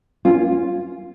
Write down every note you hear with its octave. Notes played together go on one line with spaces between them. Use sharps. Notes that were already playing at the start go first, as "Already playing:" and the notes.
C#4 F4